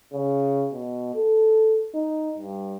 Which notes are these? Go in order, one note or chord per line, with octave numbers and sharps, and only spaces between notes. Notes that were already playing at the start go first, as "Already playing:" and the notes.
C#3
B2
A4
D#4
G2